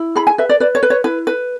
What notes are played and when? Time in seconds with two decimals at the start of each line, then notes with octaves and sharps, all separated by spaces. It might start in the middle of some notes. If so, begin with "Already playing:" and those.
Already playing: E4
0.16 G#4 B5
0.27 G#5
0.38 B4 E5
0.49 D5
0.60 B4 D5
0.75 C#5
0.83 B4
0.90 C#5
1.04 E4 B4
1.27 B4